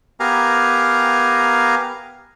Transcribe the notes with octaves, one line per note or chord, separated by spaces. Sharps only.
B3 G4 A#4 F5 G#5 A#5